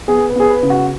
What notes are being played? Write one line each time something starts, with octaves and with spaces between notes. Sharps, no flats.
B3 G#4
B4
B3 G#4
B4
C#3
F#4